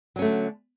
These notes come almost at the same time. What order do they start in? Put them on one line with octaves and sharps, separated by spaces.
F#3 C#4 A3 D3